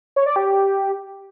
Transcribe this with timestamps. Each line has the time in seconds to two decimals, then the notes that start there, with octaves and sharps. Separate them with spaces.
0.16 C#5
0.26 D5
0.36 G4